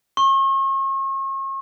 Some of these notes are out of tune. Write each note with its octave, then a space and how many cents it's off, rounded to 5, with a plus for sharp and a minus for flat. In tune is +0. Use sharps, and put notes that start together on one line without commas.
C#6 -40